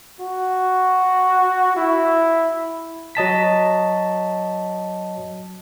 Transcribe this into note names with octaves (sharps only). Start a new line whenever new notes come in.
F#4
E4
F#3 D#5 A5 B6